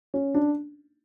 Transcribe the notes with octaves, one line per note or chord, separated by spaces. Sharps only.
C#4
D4